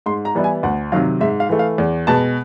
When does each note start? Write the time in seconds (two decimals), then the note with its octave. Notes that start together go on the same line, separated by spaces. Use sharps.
0.06 G#2 C6
0.25 A#5
0.35 E3 G3 B3 E4
0.44 G#5
0.63 D2 F#5
0.92 C3 D#3 F#3 F5
1.21 G#2 E5
1.40 F5
1.49 E3 A3
1.59 F5
1.78 E2
2.07 B2 G#3 A5